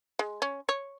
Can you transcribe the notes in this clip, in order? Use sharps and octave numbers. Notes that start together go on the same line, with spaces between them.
G#3
C#4
C#5